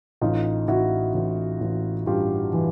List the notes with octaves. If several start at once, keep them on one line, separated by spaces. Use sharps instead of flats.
A1 D#4 F4
A1 E4 F#4
A1
A1
G2 F4 G4
E3